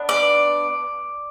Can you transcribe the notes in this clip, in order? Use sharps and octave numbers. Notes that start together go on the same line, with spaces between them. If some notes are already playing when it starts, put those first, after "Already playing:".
Already playing: B3 D4
D5